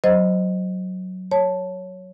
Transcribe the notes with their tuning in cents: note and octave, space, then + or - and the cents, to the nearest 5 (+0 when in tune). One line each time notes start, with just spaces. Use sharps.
F#3 +0 C5 +0 D#5 +0
C#5 +0 A5 +0